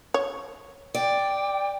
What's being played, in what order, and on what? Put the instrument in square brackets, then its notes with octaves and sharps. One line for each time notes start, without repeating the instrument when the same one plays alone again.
[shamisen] C#5
[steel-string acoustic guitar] D5 [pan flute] G5